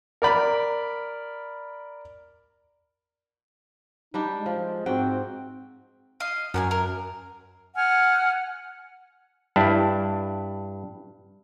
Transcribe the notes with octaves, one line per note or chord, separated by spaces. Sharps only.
A#4 D5 B5
G3 D4 D#4 G4
G#3
F3
G#2 C4 F#4 G5
D#5 F5
F#2 A#4 F#5 G#5
A#4
F#5 G#5 F6
G2 D4 E4